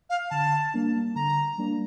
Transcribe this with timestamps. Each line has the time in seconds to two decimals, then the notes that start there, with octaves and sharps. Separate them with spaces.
0.10 F5
0.30 D3 A5
0.74 G3 A#3 D4
1.16 D3 A#5
1.58 G3 A#3 D4